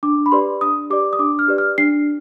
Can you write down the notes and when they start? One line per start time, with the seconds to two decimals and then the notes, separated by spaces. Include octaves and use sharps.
0.03 D4 D6
0.26 B5
0.32 G4 B4 D5 C6
0.61 D4 D#6
0.90 G4 B4 D5 D6
1.13 D#6
1.19 D4 D6
1.39 F6
1.48 G4 B4 D5
1.58 F6
1.78 D4 C7